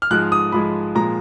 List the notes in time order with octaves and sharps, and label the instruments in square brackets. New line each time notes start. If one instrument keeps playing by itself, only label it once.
[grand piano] F6
G#2 F3 G#3 F#6
D#6
G#2 F3 G#3 B5
A#2 F3 G#3 A#5